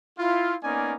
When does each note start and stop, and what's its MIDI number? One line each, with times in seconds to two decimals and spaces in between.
0.19 0.56 64
0.19 0.56 65
0.63 0.94 58
0.63 0.94 59
0.63 0.94 61
0.63 0.94 63
0.63 0.94 74
0.63 0.94 80